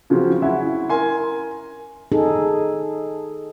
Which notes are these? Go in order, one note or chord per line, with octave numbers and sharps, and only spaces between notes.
C#3 F3 F#3 C4
C#4 E4 E5 F#5
A#4 G#5 C6
D#4 G#4 A4